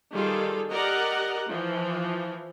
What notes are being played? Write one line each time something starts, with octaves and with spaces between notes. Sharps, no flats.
D#3 G3 F4 G#4 A4
G4 A#4 D5 D#5 F#5 A#5
E3 F3